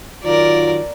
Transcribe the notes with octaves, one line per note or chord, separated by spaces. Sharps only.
D#3 F#3 F4 A#4 D5